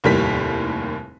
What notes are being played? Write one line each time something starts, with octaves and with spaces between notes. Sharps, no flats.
F1 D#2 A2 G3 A#3 B6